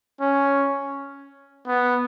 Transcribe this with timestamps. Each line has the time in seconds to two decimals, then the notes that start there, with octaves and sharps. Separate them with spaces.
0.21 C#4
1.68 B3